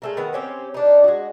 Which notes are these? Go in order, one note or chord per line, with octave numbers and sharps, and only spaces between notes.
G#3 A3 A#4
D#3 B3 F#5
C4 C#4 G4
D4 D#4
G#3 F#4